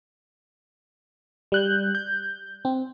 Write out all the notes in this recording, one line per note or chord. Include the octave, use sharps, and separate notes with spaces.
G3 F#6 G6
G6
C4